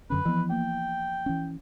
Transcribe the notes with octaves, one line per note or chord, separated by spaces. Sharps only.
F#2 D3 C#4 B4
E3 F3 B3
A#3 G5
E3 C#4